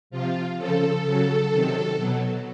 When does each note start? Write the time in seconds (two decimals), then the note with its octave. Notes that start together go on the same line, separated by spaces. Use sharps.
0.10 C3 F3 F4
0.56 C#3 F3 A4
1.04 C#3 F#3
1.50 C3 D#3 F#3
1.97 B2 F#3